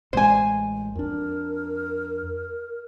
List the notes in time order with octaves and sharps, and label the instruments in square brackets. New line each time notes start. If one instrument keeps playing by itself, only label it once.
[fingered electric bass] A1 G#3 [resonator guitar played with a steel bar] C5 G#5
[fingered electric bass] F2 D4 [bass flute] A#4